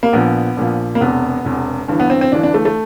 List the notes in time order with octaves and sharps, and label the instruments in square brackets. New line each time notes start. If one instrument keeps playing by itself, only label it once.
[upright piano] A#3
A#1 A#2 F3 B3
A#1 A#2 F3
A#3
E1 E2 C3 B3
E1 E2 C3
G1 G2 E3
B3
C4
C4
G1 G2 E3 D4
D4
A3
A3